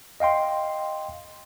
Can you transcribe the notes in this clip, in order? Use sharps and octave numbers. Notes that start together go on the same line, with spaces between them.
D#5 F5 G5 C6